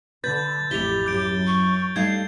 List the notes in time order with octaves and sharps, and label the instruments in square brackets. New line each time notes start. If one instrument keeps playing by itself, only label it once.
[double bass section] D3 [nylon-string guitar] B4 [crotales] G6 A6
[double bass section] A1 F2 [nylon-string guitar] E4 [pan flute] G4 [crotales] F7 G7
[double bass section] F#2 [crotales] G6 D7
[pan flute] C#6
[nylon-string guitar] G3 A3 D#4 [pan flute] F5 [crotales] G#6